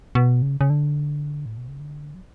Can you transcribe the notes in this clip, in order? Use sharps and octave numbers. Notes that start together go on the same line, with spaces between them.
B2
C#3
C#3
D3
A2
B2
C#3
D3
F#3